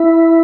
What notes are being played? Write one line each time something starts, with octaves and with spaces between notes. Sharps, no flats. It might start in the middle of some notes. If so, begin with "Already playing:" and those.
Already playing: E4